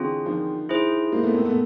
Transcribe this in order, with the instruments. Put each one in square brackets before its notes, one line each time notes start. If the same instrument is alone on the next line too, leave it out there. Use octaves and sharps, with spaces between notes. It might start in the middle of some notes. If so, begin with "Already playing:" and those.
Already playing: [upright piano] D3 E3 [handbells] C4 F4 G#4
[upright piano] D#3 F3
[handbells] E4 G#4 C5
[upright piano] G#3 A#3
A3 B3
A#3 C4
A3 B3